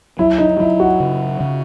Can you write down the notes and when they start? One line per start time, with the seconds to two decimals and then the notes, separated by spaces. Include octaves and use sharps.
0.19 F#3 E4
0.38 D#4
0.60 F#3 E4
0.80 F#4
1.00 C#3
1.41 C#3